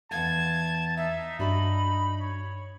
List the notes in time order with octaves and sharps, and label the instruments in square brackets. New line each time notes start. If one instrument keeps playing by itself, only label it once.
[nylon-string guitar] E2 F5 F#5 [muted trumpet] A5 [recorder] G#6
[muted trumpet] D#4 [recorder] E5
[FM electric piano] G2 [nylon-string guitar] D4 F#4 D5 [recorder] B5
[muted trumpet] C#5